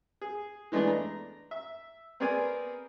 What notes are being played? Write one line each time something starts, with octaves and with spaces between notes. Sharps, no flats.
G#4
E3 G#3 A3 B3 D4
A#5
E5
B3 C4 G#4 A#4 D5 G#5